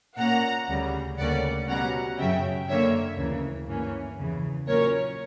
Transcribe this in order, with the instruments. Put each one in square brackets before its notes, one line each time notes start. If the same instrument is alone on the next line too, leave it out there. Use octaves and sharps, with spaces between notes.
[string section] A#2 A#3 C#4 F#5 A#5
D2 C#3 G3
D2 C#3 G3 A#3 C#4 D5 F#5
B2 G3 C#4 F#5 A#5
F#2 C#3 F#3 C#4 E5 G5
F#2 D3 A#3 C#5 E5
D2 C#3 E3 A#3
G2 E3 A#3 C#4
E2 C#3 E3
A#2 F#3 C#4 A#4 C#5